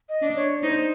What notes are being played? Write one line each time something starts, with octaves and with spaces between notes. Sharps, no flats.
D#5
D4
C#5
D#4 C5